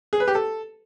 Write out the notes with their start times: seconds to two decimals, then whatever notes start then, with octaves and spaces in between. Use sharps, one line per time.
0.13 G#4
0.20 B4
0.28 G4
0.35 A4